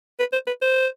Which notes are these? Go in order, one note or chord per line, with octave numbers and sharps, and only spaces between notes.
B4
C5
B4
C5